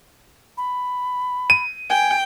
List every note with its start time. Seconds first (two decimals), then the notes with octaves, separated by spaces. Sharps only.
0.57 B5
1.50 D#7
1.90 G5 G#5